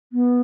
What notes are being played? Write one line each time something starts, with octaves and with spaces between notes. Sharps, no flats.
B3